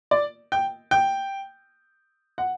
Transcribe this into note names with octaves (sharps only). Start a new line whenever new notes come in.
D5
G5
G5
F#5